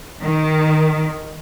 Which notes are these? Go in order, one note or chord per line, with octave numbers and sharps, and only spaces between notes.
D#3